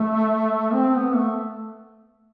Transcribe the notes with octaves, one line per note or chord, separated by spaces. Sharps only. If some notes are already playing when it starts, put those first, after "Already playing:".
Already playing: A3
C4
B3
A3